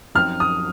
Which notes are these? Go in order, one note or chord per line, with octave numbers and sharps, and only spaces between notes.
F#2 F3 C4 D#4 F6
D#6